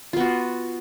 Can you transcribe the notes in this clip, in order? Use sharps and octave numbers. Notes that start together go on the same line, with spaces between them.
B3 F4 F#4